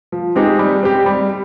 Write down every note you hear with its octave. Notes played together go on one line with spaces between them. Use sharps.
F3
G#3 C4 D#4 G4
G3
C4 G4
G3